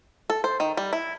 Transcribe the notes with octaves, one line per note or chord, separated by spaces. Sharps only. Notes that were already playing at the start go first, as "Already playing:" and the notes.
A4
C5
D#3
G3
E4